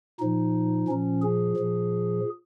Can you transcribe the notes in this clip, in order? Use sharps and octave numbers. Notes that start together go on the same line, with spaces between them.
A#2 F3 D#4
A#2 F3 C#4
G#4
A#2 F3